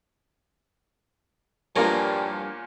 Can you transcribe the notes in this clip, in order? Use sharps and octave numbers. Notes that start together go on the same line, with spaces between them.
E2 G2 F3 G3 A#3 F4 A#4 C#5